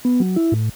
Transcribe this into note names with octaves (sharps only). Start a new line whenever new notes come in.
B3
F#3
E4
A2